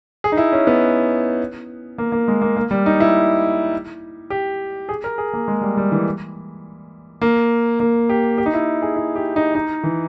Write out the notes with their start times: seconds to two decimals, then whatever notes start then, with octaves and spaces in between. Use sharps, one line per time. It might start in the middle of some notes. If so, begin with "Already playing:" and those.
0.24 G#4
0.32 D#4
0.37 E4
0.52 C#4
0.67 B3
1.98 A#3
2.12 A#3
2.28 G#3
2.41 A#3
2.57 A#3
2.71 G3
2.86 D#4
3.00 E4
4.30 G4
4.89 G#4
5.04 A#4
5.18 G#4
5.34 A#3
5.48 G#3
5.61 G3
5.77 G3
5.92 E3
7.21 A#3
7.80 A#3
8.09 G4
8.38 G4
8.46 D#4
8.53 E4
8.82 G#4
8.96 E4
9.16 G4
9.36 D#4
9.55 D#4
9.83 E3